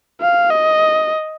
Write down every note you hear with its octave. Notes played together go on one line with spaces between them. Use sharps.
F5
D#5